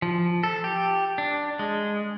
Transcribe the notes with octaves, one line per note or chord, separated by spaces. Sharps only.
F3
A4
G4
D4
G#3